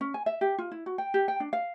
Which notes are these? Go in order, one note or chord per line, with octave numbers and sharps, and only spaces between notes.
C#4
G#5
E5
G4
F4
E4
F#4
G5
G4
G5
D4
F5